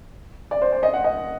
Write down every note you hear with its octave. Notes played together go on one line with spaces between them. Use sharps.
D5
C5
D5
D#5
F#5
D#5